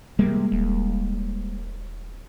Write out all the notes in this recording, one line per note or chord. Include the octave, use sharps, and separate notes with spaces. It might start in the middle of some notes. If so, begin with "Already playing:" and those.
C3 G3 G#3 A#3
D#1